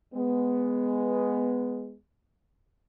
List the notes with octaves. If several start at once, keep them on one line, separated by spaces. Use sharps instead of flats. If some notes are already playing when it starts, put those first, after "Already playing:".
G#3 B3